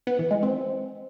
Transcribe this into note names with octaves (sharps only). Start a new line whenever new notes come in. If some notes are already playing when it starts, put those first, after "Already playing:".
B3
E3
G#3
C4